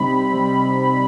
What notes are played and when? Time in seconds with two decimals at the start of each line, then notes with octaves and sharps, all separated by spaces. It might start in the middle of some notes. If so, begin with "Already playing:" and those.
Already playing: C3 G3 C4 D#4 B5
0.12 C4
0.33 G3